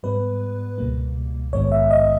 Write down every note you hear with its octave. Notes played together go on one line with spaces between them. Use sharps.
G#2 G3 B3 B4
C#2 B2 G3 A#3
A#1 G#2 D#3 G#3 B3 C#5
E5
D#5